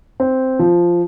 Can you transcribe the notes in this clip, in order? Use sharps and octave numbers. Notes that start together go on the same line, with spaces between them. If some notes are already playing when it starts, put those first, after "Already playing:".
C4
F3